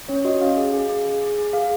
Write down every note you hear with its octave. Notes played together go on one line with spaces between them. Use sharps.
C#4 C#5
F#4 D#5
C#4 F5
G#4
G#4
G#4
G#4
G#4
G#4
G#4 F5